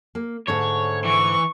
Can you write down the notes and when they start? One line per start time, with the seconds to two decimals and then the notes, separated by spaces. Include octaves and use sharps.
0.15 A#3
0.48 G#2 D3 A3 C#5
1.05 E3 C#6